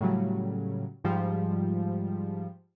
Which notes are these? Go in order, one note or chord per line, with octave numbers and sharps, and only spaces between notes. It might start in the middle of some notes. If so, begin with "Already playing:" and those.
A2 C#3 F#3 G3
G#2 F3 G3